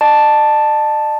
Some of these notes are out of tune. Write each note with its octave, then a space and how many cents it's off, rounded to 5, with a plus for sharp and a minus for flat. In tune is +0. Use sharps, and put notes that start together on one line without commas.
D#5 -45 A5 +0